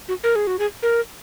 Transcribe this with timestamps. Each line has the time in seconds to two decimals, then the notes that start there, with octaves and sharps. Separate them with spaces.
0.08 F#4
0.24 A#4
0.36 G#4
0.47 F#4
0.59 G#4
0.83 A#4